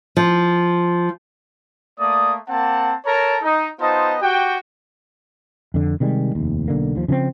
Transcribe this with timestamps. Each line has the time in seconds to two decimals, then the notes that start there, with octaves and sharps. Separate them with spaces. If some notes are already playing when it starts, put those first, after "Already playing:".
0.17 F3
1.98 A3 A#3 D5 D#6
2.49 A#3 C4 F#5 A5
3.05 A4 A#4 C#5 A5 A#5
3.42 D#4
3.80 B3 D#4 F4 C5 D#5 A5
4.20 F#4 G4 G5
5.74 F2 D3
6.00 C3 D#3 G3 G#3
6.35 F1 D#2
6.68 B1 D3 A#3
6.95 D#2 F3
7.08 C#3 F3 A3 C4